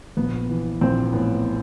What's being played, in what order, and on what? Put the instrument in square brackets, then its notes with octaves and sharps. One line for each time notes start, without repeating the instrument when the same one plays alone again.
[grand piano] A#1 [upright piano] B3
[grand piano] E3
[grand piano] A#1 [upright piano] C4
[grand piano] A2 [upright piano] B3